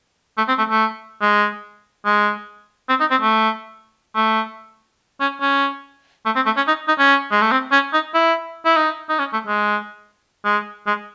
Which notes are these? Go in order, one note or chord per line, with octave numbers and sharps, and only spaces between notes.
A3
C4
A3
A3
G#3
G#3
C4
D#4
C4
A3
A3
C#4
C#4
A3
C4
A3
C#4
D#4
D#4
C#4
G#3
A3
C4
C#4
D#4
E4
E4
D#4
D#4
C#4
A3
G#3
G#3
G#3